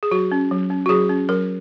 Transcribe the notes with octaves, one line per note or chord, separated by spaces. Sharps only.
G#4
F#3 F#4
C#4
F#3
C#4
F#4
F#3 G#4
C#4
F#3 A#4